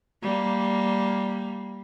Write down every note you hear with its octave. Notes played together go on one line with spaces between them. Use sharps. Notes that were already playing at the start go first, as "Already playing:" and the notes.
G3 A#3